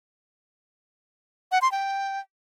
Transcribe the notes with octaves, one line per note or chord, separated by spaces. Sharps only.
F#5
C6
G5